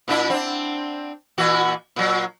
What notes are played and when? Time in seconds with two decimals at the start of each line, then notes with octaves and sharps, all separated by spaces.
0.08 A#2 D4 E4
0.30 C4 D4
1.38 A#2 E3 F#4
1.96 A#2 F#3